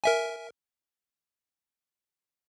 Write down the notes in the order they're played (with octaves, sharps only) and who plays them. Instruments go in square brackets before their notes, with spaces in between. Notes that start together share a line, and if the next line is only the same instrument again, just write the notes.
[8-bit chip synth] A#4 E5 G#5